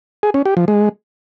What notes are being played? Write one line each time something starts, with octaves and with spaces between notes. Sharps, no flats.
G#4
C#4
G4
F3
G#3